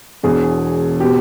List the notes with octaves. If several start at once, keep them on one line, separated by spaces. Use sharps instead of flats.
E1 E2 B2 G#4
B2 G4